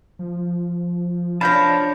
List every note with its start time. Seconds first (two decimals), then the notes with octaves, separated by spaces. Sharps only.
0.19 F3
1.41 F3 D4 C#5 F5 A5 B5 G6 A#6